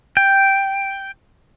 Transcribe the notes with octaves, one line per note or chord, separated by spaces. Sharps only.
G5